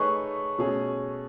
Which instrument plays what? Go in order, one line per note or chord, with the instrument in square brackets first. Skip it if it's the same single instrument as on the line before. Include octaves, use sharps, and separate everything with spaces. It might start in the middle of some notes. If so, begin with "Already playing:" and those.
Already playing: [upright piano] A3 D#4 G#4 B4 [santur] C#5
[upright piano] B2 A3 C#4 G#4